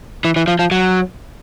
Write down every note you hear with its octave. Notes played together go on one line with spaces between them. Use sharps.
E3
E3
F3
F3
F#3